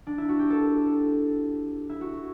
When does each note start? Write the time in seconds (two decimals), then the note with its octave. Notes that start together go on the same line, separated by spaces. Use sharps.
0.07 D4
0.18 E4
0.29 F#4
0.39 G4
0.50 A4
1.89 E4
2.01 F#4